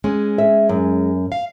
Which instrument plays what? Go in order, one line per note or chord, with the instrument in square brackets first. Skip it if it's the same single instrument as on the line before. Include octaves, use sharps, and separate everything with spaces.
[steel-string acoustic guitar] G#3 C#4
[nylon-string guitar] E5
F#2
[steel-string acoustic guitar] F5